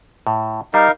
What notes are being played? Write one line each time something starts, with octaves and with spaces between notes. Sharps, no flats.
A2
G3 D#4 A#4 F5